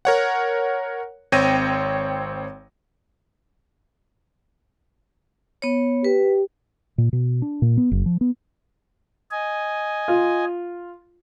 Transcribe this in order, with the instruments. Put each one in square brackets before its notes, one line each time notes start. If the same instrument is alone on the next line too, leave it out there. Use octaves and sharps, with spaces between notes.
[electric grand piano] A#4 C#5 F#5
G#1 C4 C#5 G5 A#6 D#7
[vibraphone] B3 C#5
[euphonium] G4 [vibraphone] B4
[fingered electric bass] A#2
B2
D4
A#2
B3
F#1
F3
B3
[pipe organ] D#5 G#5
[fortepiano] F4